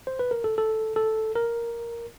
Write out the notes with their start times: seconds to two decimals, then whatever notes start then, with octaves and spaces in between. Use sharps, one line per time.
0.07 C5
0.19 B4
0.31 A#4
0.44 A4
0.58 A4
0.96 A4
1.35 A#4